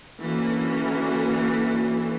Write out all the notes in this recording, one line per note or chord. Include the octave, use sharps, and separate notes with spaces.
D3 E3 A#3 C#4 F#4 A4